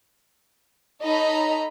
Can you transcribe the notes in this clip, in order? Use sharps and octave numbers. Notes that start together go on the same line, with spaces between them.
D#4 A4 C#5 D#5 A#5 B5